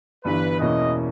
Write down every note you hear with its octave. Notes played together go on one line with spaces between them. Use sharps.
G1 G2 E3 B4
E2 B2 A#3 C#4 E4 D#5